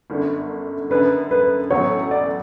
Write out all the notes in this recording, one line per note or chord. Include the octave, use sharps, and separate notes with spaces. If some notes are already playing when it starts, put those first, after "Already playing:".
G1 F#2 D3
F#1 F#2 D3 B4
B4
A1 A2 F#3 B3 C#5
D5